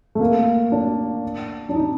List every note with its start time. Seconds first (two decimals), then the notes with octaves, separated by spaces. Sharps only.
0.15 A3
0.20 A#3
0.72 D4
1.69 D4
1.75 D#4